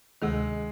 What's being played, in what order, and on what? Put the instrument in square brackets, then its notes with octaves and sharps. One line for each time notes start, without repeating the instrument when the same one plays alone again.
[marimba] D2 C3 D#3 [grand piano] G#3